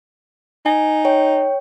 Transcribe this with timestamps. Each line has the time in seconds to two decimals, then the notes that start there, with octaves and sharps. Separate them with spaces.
0.66 D#4 G#5
1.05 C#5 G5